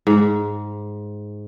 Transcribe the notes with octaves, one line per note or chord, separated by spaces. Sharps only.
G#2